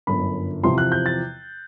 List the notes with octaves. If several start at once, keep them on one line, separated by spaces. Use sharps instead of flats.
G1 F#2 D3 B5
E2 C3 F3 C6
F#6
G6
A6